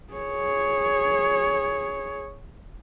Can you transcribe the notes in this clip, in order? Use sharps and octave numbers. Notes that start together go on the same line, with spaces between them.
G#4 C#5